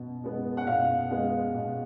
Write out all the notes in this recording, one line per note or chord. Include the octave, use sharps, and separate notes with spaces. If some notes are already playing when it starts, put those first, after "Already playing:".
Already playing: B2
G#3 B3
F#5
B2 F5
G#3 B3
B2